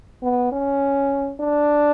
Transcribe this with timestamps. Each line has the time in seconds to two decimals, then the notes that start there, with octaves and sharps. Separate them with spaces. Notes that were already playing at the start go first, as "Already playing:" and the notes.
0.22 B3
0.52 C#4
1.40 D4